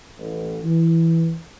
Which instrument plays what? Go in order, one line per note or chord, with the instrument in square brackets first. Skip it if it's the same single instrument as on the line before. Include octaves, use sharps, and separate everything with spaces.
[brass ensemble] A1
E3